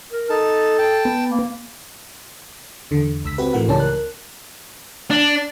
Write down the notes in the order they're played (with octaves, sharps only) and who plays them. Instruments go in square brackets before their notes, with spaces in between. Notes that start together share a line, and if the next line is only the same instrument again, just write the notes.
[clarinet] A#4
[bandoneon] D#4 A5 [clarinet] A4
[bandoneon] G5 A5
[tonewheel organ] B3
[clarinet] A#3
[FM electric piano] E2 D3
C#2 E6 B6
C4 F#4 G4 B4
A2 E3 F3 A3 A#4 F#5
C#2 E3 C#4 G4 D5 A5
A#4 F#6
[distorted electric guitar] D4